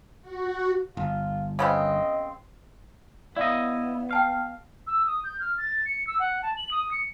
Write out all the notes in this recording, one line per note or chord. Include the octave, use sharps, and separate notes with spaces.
F#4
G1 F4
C#3 B3 C4 D#5
B3 E4 D5 D#5 F5
F5 G5 A5 F6
E6
D#6
G6
F6
A6
C#7
E6
F#5
A5
F#7
D#6
C#7